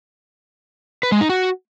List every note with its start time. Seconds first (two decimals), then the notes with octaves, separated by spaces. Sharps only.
1.03 B4
1.12 G#3
1.21 D#4
1.29 F#4